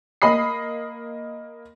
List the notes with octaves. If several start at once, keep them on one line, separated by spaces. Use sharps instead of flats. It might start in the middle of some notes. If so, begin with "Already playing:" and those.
A#3 D#5 B5 D#6 C7